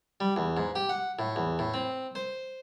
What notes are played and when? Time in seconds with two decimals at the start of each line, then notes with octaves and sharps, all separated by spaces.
0.20 G3
0.36 E2
0.57 G#2
0.75 G4
0.89 F#5
1.19 A2
1.36 E2
1.59 A2
1.74 C4
2.15 C5